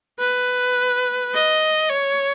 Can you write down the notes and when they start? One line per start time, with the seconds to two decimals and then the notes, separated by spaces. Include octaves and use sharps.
0.19 B4
1.33 D#5
1.90 C#5